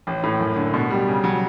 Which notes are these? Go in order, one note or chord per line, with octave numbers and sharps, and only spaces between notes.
A1
A2
F#2
D3
B2
G3
C#3
F#3